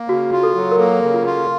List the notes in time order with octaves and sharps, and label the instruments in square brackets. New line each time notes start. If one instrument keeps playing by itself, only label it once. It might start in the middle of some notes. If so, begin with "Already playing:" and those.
Already playing: [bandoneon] A#3
[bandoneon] C#3 [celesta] F#4
[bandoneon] F4
[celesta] A4
[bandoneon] F#3
[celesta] A#4
[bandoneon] A#3 [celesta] A4
[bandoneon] C#3
[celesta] F4
[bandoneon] F4